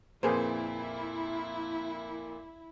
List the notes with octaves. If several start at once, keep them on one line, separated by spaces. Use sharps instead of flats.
F2 A#2 A#3 E4 G#4 B4 C5